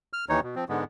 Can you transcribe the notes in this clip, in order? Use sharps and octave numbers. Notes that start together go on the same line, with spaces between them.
F6
D#2 E3 D#4 C#5
B2
F3 C4
G#2 D3 G#3 B3